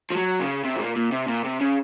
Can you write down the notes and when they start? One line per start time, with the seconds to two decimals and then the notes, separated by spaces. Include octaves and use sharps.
0.10 F3
0.16 F#3
0.39 C#3
0.64 C3
0.75 G#2
0.80 A#2
0.96 A#2
1.12 C3
1.28 A#2
1.44 C3
1.61 C#3